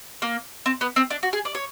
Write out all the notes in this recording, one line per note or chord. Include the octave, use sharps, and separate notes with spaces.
A#3
C4
B3
C4
D4
F#4
G#4
D5
C#5